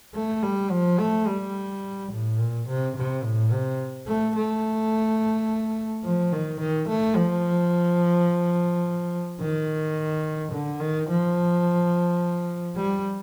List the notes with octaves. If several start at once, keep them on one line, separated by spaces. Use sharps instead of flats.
A3
G3
F3
A3
G3
A2
A#2
C3
C3
A2
C3
A3
A3
F3
D#3
D#3
A3
F3
D#3
D3
D#3
F3
G3